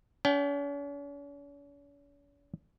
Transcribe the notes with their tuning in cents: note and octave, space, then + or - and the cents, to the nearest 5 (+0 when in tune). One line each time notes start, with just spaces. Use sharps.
C#4 +45 G5 -15